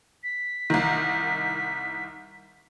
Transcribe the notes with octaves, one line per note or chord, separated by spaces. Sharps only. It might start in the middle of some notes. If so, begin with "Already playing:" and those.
B6
C2 D#3